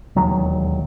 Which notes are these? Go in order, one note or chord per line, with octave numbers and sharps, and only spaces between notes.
E1 D#2 F#3